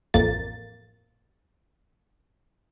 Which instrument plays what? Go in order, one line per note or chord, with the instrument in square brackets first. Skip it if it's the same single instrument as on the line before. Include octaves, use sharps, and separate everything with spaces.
[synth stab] A1 F2 A#3 A6